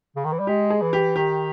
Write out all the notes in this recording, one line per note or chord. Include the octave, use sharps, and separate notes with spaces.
C#3
D#3
E3
G3
G#3 G4
G#4
E3
G4
D#3 G4